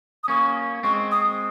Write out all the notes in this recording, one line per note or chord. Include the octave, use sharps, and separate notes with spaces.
D#6
A#3 C#4 C#6
G#3 C4 C#6
D#6